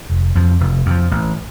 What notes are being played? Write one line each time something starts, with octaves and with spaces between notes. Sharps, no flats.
F1
F2 F3
F1
F2 F3
A1